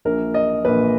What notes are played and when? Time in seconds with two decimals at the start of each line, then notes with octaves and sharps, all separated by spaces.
0.05 A#1 A#2 A#3 A#4
0.34 D#5
0.65 A#1 A#2 A#3 B4